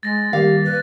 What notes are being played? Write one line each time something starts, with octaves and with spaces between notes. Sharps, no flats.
G#3 A6 A#6
D#3 G3 A#3 G4 F5
B4